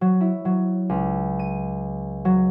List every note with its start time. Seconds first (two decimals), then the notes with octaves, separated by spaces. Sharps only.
0.01 F#3
0.21 E4
0.45 F#3
0.89 C#2
1.39 D#7
2.25 F#3